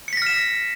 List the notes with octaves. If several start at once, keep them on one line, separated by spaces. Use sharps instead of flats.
F6 A#6 B6 C#7 E7